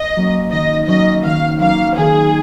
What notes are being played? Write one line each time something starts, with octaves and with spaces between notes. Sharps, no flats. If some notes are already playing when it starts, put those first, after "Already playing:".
Already playing: D#5
F#3 A#3 C#4
D#3 D#5
F#3 A#3 C#4 D#5
D#3 F5
F#3 A#3 C#4 F5
D#3 G#4